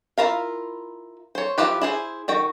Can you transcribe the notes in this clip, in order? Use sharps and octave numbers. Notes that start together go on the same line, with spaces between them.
E4 F4 A#4 F5
C5 C#5
F3 E4 F4 G4 B4
E4 G#4 C5
D#3 F#4 G5